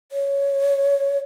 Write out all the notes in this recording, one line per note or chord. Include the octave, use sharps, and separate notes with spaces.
C#5